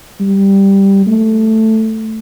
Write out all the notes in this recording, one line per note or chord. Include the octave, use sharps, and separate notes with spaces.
G3
A3